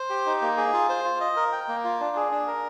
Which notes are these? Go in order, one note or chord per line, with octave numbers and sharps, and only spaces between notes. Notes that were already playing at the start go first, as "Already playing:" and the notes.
Already playing: C5
G4
D#4
A#3
G#4
F4
C5
F4
D#5
A#4
G5
A#3
F4
D4
G#4
D4
A#4